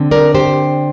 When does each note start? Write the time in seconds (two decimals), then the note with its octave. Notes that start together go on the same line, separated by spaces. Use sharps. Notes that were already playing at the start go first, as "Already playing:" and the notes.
Already playing: D3 C4
0.11 A#4 D5
0.35 G4 C5